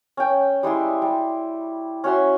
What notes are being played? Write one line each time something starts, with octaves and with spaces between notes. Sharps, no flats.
C#4 G5
G3 G#3 E4 C6
G3
C#4 F#4 E5 C6